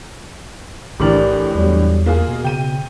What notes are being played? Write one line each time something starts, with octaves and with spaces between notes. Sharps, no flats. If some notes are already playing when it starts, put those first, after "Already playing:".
B1 A2 D3 E3 G4 A#4 D5
E2 F#3 G3
A#3 F4 G#4
B2
C#3 G5 D#7